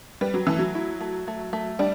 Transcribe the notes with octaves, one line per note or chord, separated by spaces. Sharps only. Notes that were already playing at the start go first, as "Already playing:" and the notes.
G3 B4
F#3
E3 A3
F#3
E4
A3
A3
A3
G3 D4